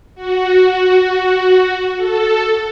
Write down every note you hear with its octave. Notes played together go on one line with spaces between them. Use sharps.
F#4
A4